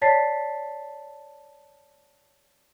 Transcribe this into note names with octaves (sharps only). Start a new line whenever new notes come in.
C#5 D5 A5 A6 B6 C7